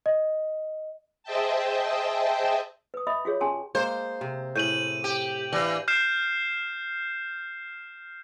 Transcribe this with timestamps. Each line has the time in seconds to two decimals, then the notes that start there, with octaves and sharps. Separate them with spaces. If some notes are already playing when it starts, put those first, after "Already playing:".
0.06 D#5
1.23 G#4 C5 D#5 E5 G5 A5
2.94 B4 D#6
3.07 D#5 E5 B5 D#6
3.25 F4 F#4 G#4 C#5
3.41 C#4 G4 G#4 G#5 A5 C6
3.75 G#3 A#3 C5
4.21 C3
4.56 A2 A3 G#4 G6 D#7 F#7
5.04 G4
5.53 E3 D4 F5 F#7
5.88 F6 G6 C7 E7